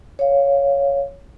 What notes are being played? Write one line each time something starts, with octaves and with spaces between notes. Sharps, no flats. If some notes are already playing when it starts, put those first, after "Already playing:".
C#5 F5